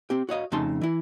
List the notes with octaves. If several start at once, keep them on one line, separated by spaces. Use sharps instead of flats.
C4 G4
F#4 C#5 D#5 F5
F2 C#3 A3 D#4 A5 C6
E3 E4